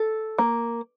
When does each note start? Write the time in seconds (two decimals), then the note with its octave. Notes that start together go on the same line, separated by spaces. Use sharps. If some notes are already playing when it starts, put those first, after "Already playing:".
Already playing: A4
0.38 A#3